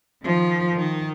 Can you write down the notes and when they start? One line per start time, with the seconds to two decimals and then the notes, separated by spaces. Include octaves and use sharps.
0.23 D#3 F3
0.74 D#3